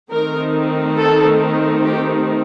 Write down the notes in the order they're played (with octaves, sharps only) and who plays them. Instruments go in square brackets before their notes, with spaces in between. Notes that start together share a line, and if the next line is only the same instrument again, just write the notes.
[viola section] D#3 A3 C4 D#4 A#4
A4
G4